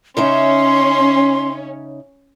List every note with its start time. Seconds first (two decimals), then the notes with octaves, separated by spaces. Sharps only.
0.17 C#3 C#4 D#4 E5 C6